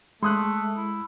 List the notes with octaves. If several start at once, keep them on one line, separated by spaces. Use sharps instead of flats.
G#3 A3 C6 D#6 F#6
E4